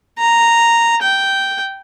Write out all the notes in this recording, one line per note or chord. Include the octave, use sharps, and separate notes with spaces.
A#5
G5